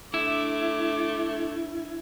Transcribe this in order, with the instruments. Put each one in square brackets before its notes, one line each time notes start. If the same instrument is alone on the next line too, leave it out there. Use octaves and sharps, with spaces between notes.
[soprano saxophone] A3 [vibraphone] D4 E5 [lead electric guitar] E4 [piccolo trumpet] D6